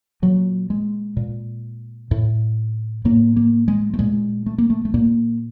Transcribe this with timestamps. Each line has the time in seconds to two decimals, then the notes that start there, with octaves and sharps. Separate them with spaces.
0.22 A#2 F#3
0.70 G#3
1.17 A#2
2.11 A2
3.05 A2 A#3
3.36 A#3
3.68 G#3
3.94 A3
3.99 A#2 G#3
4.46 A3
4.58 A#3
4.70 A3
4.85 A3
4.94 A#2 A#3